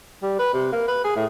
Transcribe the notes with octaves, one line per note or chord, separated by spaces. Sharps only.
G3
B4
C3
A#3
B4
G#4
A2